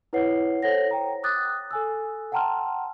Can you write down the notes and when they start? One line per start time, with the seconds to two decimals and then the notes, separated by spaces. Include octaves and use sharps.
0.13 E4 B4 C#5 F#5 C7
0.63 A4 C5 C#5 F#5 A#6
0.91 G5 A#5
1.23 D6 D#6 F#6 A6
1.71 A4 G#5 E6
2.32 F#5 G5 A5 A#5 C6 F6